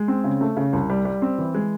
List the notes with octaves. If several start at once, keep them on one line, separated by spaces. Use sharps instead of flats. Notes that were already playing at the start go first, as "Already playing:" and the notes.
Already playing: G#3
C4
C#3
A3
C#3
C2
G3
G3
C4
E3
G#3